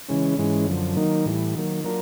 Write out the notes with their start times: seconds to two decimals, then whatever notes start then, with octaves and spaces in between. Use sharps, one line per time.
0.09 C#3 E3 G#3 C#4
0.38 G#2 E3 G#3 C#4
0.67 F#2 D3 F3
0.96 D#3 F#3 A#3 D#4
1.26 A2 E3 G3
1.55 D#3 F#3 A#3
1.84 F#3 A#3 D4 F4 A#4